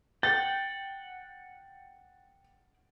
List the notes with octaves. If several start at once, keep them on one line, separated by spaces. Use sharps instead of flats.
F#5 G5 A6